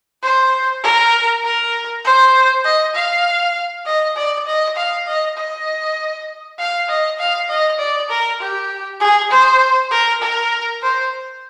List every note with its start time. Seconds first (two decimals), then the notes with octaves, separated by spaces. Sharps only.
0.22 C5
0.83 A#4
1.44 A#4
2.04 C5
2.64 D#5
2.95 F5
3.86 D#5
4.17 D5
4.47 D#5
4.76 F5
5.07 D#5
5.37 D#5
6.59 F5
6.89 D#5
7.19 F5
7.49 D#5
7.79 D5
8.10 A#4
8.40 G4
9.00 G#4
9.31 C5
9.91 A#4
10.21 A#4
10.82 C5